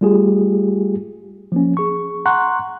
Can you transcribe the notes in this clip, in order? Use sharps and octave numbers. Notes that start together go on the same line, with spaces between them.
G3 A3 F4 G4 G#4
F3 A#3 C#4
G#4 C#6
F#5 A#5 C6 C#6 F#6